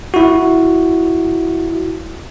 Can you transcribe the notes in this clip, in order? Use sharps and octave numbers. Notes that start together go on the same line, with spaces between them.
E4 F#4